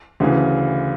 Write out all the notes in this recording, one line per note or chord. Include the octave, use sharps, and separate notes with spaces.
D2 C#3 E3